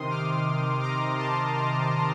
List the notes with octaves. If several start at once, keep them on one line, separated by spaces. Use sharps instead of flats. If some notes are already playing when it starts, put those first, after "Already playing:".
Already playing: C3 D#3 C6 D#6
D6 F6
A#5 D6
A5 C6